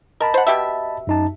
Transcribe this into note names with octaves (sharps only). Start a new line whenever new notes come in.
A#4 D#5 A5 B5
C5 F#5
B2 G4 E5
F#2 D#4 A5